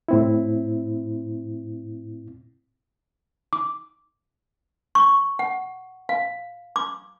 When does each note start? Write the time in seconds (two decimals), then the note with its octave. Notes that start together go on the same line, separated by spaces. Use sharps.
0.09 A2 C4 E4
3.53 D6
4.95 C#6
5.39 F#5
6.09 F5
6.76 D6